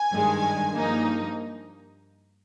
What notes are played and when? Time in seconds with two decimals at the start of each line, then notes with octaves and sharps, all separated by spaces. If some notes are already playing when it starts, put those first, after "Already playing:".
Already playing: G#5
0.11 G2 D#3 G#3
0.73 G2 F3 A#3 D#4